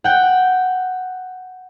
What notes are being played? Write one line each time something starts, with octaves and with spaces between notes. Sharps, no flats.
F#5 G5